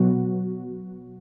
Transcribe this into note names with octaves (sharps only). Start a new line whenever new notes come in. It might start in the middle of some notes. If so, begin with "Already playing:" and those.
Already playing: B2 F#3 B3 F#4